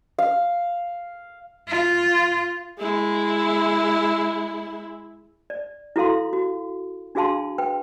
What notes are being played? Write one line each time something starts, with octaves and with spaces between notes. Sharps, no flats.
F5
F4
G#3 E4
D5
E4 F#4 A4 F5 C6
F#4
D4 F#4 G#4 F5 A5 C6
B4 G5